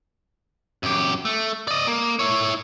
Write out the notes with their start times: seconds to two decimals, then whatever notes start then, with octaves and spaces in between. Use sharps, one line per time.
0.83 F#2 G4
1.25 A3
1.68 D5 D#5
1.87 A#3
2.19 E4 C#5